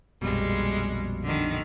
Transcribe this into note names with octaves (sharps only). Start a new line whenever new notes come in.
A#1 F2 B2 G3 G#3
D3 D#3